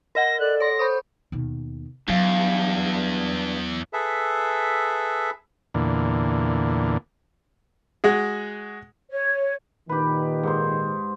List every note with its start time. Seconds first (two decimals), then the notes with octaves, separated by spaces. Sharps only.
0.15 A#4 D#5 F#5 A#6
0.39 A4 D5 F#6
0.60 C#5 C6 A#6
0.79 C5 B5 C#6 D#6
1.32 D#2 B2
2.08 E2 G2 F#3 F5
3.93 G#4 A4 B4 E5
5.74 E2 A#2 D3
8.04 G#3 F#4 G#4
9.11 C#5
9.89 A#2 D#3 G4 B4
10.43 G#2 C5